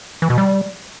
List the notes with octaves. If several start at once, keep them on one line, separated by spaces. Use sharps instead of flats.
E3
B2
G3